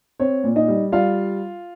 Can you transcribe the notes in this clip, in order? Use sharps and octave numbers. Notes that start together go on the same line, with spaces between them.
C4 C#5
A#2
D#4 D#5
G3
G3 F4 F5